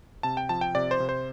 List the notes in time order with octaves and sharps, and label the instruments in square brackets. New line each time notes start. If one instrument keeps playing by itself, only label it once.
[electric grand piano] C3 A5
G5
F3 A5
G5
C3 D5
C5
C3
C5